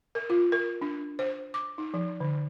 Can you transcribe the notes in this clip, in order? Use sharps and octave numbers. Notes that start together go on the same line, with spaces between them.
A#4
F4
A#4
D4
C5
D6
D#4
F3
D3